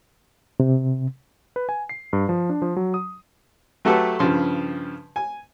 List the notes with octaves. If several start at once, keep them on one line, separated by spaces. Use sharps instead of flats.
C3
B4
G#5
C7
G2
F3
D4
F3
F#3
D#6
F#3 A3 F#4 G4 A4 B4
G2 C#3 F3 C6
G#5